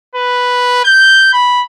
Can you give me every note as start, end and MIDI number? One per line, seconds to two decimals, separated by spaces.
0.15 0.80 71
0.85 1.29 91
1.33 1.63 83